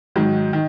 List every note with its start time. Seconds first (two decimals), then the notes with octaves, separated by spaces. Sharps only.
0.16 G#2 D#3 F#3
0.53 D#3